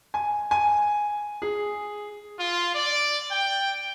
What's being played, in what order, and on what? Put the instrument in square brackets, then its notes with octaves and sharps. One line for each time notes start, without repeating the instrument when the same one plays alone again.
[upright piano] G#5
G#5
G#4
[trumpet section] F4
D5
G5